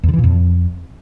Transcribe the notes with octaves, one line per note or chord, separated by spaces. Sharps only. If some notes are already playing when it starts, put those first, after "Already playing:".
E2
D3
E3
A#2
F2